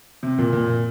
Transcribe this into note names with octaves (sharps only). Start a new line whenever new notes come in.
C3
A#2
A#2